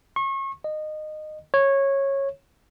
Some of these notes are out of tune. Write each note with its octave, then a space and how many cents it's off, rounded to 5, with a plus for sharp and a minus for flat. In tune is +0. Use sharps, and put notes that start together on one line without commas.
C#6 -35
D#5 -20
C#5 -15